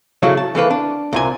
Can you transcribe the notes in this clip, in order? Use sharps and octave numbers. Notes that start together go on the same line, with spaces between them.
C#3 F#3 A3 C#4 E4 F#4
A5
E3 A3 A#3 B4
D4
C2 A#2 G#5